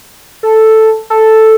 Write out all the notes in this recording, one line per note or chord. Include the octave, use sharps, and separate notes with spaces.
A4
A4